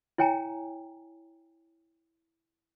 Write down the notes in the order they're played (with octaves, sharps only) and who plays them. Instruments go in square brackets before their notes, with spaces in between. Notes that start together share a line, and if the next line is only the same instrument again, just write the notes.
[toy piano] E4 C#5 G5 G#5 A#5